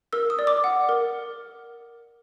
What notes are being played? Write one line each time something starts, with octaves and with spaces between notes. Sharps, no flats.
A#4 E6
D#6
D5
D6
F#5
A#4